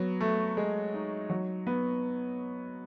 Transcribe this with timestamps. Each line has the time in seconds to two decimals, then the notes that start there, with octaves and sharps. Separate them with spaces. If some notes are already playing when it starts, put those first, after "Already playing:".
Already playing: F#3 B3
0.21 A3
0.57 G#3
0.94 D#4
1.30 F#3
1.67 B3